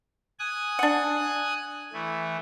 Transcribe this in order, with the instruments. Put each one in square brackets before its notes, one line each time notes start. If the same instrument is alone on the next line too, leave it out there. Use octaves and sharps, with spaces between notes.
[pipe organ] G#5 D#6 F#6
[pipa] D4 F#5
[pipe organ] E3 A3